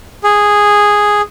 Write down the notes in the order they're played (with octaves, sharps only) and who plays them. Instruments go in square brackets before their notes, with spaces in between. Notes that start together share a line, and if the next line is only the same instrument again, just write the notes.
[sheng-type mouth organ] G#4